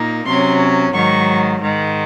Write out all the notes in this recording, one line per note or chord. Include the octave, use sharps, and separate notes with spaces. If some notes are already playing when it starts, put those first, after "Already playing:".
Already playing: A#2 A#3 D#4
C3 F#3 C#4 C6
G#2 D#3 F#3 C#6
G#2 D#3 G#3